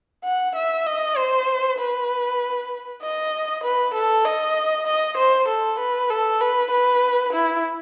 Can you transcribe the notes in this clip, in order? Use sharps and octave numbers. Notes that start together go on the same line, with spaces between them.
F#5
E5
D#5
C5
B4
D#5
B4
A4
D#5
D#5
C5
A4
B4
A4
B4
B4
E4